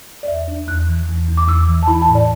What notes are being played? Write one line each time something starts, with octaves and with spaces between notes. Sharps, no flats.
D5
E2 E5
D4
E2 F#6
E3
E2
E2
D6
E2 E6
E3
A5
E4 B5
A5
A2
D5